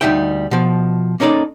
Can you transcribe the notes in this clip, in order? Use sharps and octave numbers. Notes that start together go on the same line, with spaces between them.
D2 D#3 G3 D#4 E5 G5
B2 F3
A#3 C#4 D#4 A4 D5